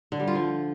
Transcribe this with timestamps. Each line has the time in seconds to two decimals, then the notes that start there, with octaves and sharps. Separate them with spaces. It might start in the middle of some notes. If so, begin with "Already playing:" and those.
0.12 D3
0.20 G3
0.27 F4
0.35 F3